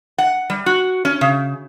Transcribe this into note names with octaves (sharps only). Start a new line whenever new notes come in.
F#5
G3
F#4
C#4
C#3